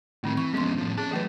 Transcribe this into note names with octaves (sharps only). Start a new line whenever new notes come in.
A2 D#3 A3 C4
E3 C#6
F2 G#3 B3 C#4 C6
A2 F3
C#4 G#4 A5
E3 F#3 A3 G#4 B4